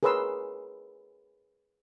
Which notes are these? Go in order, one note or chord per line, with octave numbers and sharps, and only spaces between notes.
G#4 A#4 B4 C#5 C6 E6